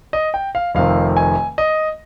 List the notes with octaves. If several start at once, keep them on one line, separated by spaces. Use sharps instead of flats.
D#5
G5
F5
F1 F2 C3 D#3 F5
G#5
D#5